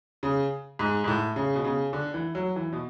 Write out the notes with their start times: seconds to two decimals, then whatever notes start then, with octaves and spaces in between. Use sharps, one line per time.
0.23 C#3
0.79 G#2
1.04 G#2
1.08 A2
1.36 C#3
1.55 B2
1.65 C#3
1.93 D3
2.14 E3
2.35 F#3
2.56 E3
2.73 B2